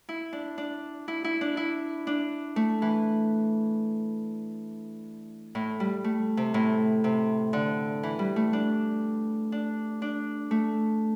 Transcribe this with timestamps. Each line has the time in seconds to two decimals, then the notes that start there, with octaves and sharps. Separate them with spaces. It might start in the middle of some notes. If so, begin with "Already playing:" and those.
0.09 E4
0.33 D4
0.58 D4
1.08 E4
1.24 E4
1.41 D4
1.57 E4
2.07 D4
2.56 A3
2.82 E3
5.55 A2
5.80 G3
6.04 A3
6.37 C3
6.54 A2
7.04 C3
7.53 D3
8.03 E3
8.19 G3
8.36 A3
8.53 D4
9.52 D4
10.02 D4
10.51 A3